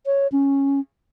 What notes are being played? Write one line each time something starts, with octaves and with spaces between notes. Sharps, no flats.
C#5
C#4